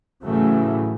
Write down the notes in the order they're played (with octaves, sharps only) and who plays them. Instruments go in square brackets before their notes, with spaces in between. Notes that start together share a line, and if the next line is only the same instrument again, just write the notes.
[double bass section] A2 C#3 E3 F#3 A3